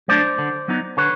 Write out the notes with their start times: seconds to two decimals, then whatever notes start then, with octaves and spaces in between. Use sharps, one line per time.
0.08 F#3 A3 D4 C5 D5
0.38 D3
0.68 F#3 B3 D#4
0.97 D3 B4 C#5